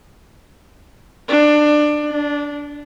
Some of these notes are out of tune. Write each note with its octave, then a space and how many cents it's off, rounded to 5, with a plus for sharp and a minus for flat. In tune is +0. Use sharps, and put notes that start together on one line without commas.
D4 +20
D4 -15